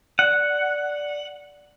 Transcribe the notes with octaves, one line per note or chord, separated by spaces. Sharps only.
D5 F#5